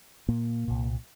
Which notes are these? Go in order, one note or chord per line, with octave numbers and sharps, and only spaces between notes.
A#2 A#3
C2 A#2